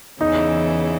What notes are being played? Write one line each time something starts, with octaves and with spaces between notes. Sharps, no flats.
E2 C#3 E3 D#4